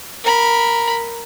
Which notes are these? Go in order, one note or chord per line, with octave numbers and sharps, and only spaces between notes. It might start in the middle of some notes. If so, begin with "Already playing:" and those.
A#4 B5